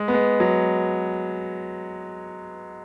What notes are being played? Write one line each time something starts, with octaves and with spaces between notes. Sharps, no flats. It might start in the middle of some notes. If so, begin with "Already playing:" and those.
Already playing: G#3
B3
G#3
F#3